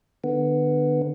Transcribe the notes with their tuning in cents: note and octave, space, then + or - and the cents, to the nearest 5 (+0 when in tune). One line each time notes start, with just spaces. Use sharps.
D3 +30 B3 +0